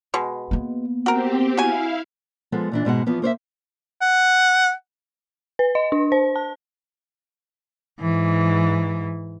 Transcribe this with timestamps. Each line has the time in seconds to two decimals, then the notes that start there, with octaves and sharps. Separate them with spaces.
0.14 B2 G#3
0.51 A#3 B3
1.06 C4 F#4 G4 A#4
1.57 E4 F#4 F5 G#5
2.52 F3 G#3 B3 A4 F#5
2.72 A#2 E3 D4
2.85 G#2 B2 G#3 F#5
3.06 E2 F3 B3
3.22 A#3 C5 C#5 E5
4.01 F#5
5.59 B4
5.75 D#5
5.92 D4
6.12 C5
6.36 A5
8.01 G#2 E3